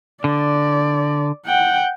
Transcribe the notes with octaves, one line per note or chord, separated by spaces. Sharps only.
D3 D5
F#5 G5